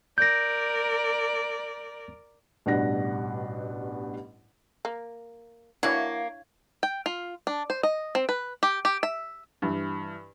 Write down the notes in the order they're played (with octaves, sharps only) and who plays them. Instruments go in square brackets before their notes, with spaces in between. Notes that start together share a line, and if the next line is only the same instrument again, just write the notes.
[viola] A#4 D5 [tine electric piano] G6 A#6
[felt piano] A1 G2 B2 D4 F#5 A#6
[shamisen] A#3
[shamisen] E3 F#4 [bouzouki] A#3 [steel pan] D4 E4 C#5 [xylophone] F5 G#6
[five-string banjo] G5
F4
D4
C5
D#5
C4
B4
G4
G4
E5
[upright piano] G2 E3